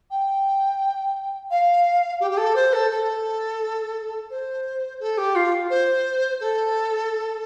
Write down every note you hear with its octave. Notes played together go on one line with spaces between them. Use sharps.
G5
F5
G4
G4
A4
C5
A4
A4
C5
A4
G4
F4
C5
A4